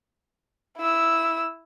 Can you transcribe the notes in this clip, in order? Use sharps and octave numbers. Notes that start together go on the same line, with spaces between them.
E4 E6